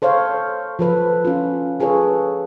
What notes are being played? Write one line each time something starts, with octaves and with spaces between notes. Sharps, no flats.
A4 C5 C#5 F5
F3 A4 B4
C#4 F4
F4 G#4 A4 B4 C#5